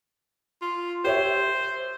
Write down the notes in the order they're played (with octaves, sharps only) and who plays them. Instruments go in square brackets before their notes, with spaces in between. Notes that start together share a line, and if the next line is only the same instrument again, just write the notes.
[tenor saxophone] F4
[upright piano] G4 C#5 E5 [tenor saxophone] C5